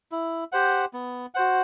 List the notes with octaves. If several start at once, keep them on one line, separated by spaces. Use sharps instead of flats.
E4
G4 C5 F#5
B3
F#4 C5 F#5